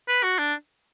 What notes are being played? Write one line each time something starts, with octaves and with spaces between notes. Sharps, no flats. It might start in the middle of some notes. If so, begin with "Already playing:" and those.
B4
F#4
D4